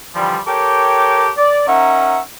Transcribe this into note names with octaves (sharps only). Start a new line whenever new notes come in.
D3 E3 F3 G3
G4 A4 A#4 C#5 G5 D6
D5
C#4 D#4 A#4 E5 F#5